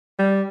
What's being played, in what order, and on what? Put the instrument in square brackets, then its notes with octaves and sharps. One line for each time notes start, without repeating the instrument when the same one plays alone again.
[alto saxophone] G3